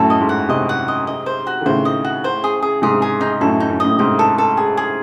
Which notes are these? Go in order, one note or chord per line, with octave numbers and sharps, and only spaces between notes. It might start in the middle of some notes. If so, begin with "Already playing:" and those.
Already playing: F#2 A2 A4
D#5
G#2
F#5
G#2 C3 D#5
F#5
D#5
D#5
C5
F#4
D#3
A2 C#3 C5
D#5
F#4
C5
G#4
G#4
G#2 C3 G#4
G#4
D#4
F#2 A2 A4
D#4
F#2
F#2 A2 D#5
G#2 C3 D#4
A4
A4
G#4
G#4